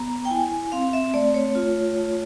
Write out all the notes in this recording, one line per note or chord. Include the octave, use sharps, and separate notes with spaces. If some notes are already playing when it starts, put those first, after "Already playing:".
Already playing: B3 A#5
G5
E4 G#5
C4 F5
E5
A3 D5
C#5
F4
A3